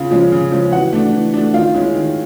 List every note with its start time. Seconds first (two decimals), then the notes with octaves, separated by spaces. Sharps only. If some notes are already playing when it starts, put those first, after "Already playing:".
Already playing: C#3 F4 F5
0.11 F3 G#3 C#4
0.32 C#3
0.52 F3 G#3 C#4
0.72 E3 F#4 F#5
0.93 A3 D4
1.13 E3
1.34 A3 D4
1.54 D#3 F4 F5
1.74 G#3 C#4 E4
1.95 D#3